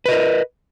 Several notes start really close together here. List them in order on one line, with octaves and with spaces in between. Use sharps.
B4 D#5 A#4